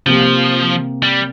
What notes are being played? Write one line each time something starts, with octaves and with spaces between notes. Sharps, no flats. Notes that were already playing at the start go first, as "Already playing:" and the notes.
C3 F3 A#3 G4
G3